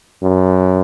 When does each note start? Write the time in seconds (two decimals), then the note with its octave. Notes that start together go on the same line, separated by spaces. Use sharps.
0.23 F#2